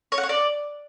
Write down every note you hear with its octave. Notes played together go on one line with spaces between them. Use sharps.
C#5
F#5
C#5
D5